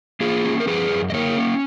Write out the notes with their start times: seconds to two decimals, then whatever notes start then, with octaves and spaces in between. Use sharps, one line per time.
0.20 A#3 F4 G#4
0.44 C#4
0.60 A#4
0.67 F3 G#4 B4
0.91 F#2
1.10 D#5
1.14 A#3 A#4 C#5
1.37 C#4